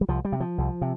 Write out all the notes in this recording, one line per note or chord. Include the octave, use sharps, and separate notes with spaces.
G3
C2 F3
G3
C3
F3
C2
C3